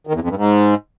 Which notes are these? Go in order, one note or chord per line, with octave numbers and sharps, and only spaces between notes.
D#3
E2
F2
G2
G#2